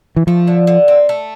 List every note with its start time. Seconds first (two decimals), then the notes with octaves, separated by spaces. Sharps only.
0.16 E3
0.27 F3 A3
0.47 D3
0.67 D3
0.88 C4
1.09 A3